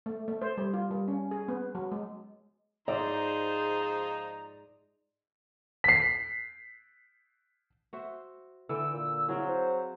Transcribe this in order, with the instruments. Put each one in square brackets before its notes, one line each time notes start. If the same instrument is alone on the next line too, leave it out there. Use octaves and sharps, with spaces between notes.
[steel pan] A3
A3
C5
G3
F4
G3
C#4
G#4
B3
F#3
G#3
[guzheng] G#2 [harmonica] F3 D#4 A#5 [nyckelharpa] G#4 C5 [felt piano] D5
[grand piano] B6 C7
[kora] F#4 C5 E5
[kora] D3 G5 [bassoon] E3 [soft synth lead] E6
[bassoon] A#2
[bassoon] F#3 [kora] C4 F4 G#4 [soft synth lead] E4
[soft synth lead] C5